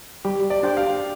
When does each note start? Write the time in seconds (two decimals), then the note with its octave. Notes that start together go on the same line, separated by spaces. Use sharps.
0.25 G3 G4
0.50 D5
0.63 D4 G4 C5 G5
0.77 F5